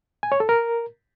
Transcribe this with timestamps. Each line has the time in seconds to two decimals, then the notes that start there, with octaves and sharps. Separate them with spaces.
0.23 G#5
0.32 C#5
0.40 A4
0.49 A#4